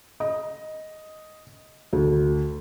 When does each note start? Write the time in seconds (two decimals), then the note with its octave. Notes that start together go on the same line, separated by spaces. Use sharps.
0.20 D#5
1.93 D2